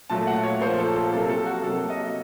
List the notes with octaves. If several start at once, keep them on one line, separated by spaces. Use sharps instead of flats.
A#2 F#3 A3 A5
F#5
C#5
A#2 F3 A#3 C5
A4
A4
C3 F#3 A#3 A4
A4
F#4
C3 F#3 A#3 A4
D#5